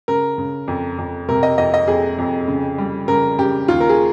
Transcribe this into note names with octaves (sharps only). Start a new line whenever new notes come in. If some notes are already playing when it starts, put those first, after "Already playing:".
C#3 A#4
C#3
F2
F2
C3 A#4
D#5
F2 D#5
D#5
F2 G#4
F2
C#3
G3
C#3 A#4
C#3 G4
D#2 F4
A#4
G#4